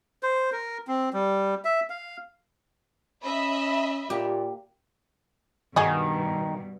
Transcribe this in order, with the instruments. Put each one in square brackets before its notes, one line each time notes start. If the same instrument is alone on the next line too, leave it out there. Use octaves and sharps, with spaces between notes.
[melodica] C5
A#4
C4
G3
E5
F5
[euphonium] C#4 [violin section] D#5 E5 B5
[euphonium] A#2 [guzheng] G4
[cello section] G2 B2 [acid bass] D#3 [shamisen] D#4 F#4 G#4